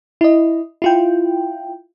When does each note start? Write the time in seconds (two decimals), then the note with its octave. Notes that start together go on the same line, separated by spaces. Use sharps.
0.21 E4 D#5
0.82 E4 F4 G5